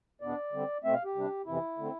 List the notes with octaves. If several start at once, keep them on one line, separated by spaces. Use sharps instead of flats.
E2 B2 B3 D4 D5
D3 G3 C4
B2 A3 C4 E5
F5
G4
C3 G3 D4
F2 C3 E3 E4
D3 A3 C4